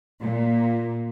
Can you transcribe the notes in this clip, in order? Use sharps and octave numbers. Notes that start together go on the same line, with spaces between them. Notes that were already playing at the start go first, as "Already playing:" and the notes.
A#2